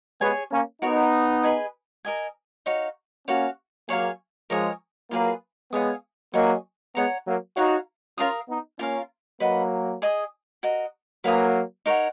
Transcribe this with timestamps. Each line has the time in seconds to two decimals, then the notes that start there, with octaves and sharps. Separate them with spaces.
0.21 G#3 B3 G#4 C#5 G#5
0.51 A#3 C#4
0.82 B3 D#4 F#4 A#4 C#5
1.43 G#4 B4 D#5 G#5
2.05 A#4 D#5 G#5
2.66 D#4 F#4 C#5 F5
3.27 A#3 C#4 F#4 C#5 F5
3.89 F#3 A#3 G#4 C#5 F5 G#5
4.50 F3 G#3 A#4 C#5 G#5 D#6
5.11 F#3 A#3 F4 G#4 B4
5.72 G#3 B3 C#5 F5 G#5 D#6
6.34 F#3 A#3 G#4 D#5 G#5 C#6
6.95 G#3 B3 C#5 F#5 A#5
7.25 F#3 A#3
7.56 D#4 F#4 C#5 F5 A#5
8.18 C#4 F4 A#4 F5 A#5 D#6
8.48 B3 D#4
8.79 A#3 C#4 F4 A#4 F5
9.40 F#3 A#3 B4 D#5 F#5 B5
10.02 G#4 D#5 G#5 D#6
10.63 F#4 A#4 D#5
11.24 F#3 A#3 B4 F5 G#5 D#6
11.86 D#4 A#4 C#5 F#5